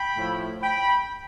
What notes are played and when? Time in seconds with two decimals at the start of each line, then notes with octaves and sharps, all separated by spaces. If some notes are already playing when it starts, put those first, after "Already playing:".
Already playing: G5 B5
0.14 A2 F3 A3 E4
0.61 G5 B5